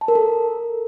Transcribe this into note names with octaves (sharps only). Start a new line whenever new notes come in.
A5
A#4
A4